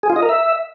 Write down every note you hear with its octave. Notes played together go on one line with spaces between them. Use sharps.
G#4
F4
D#5
A#4
E5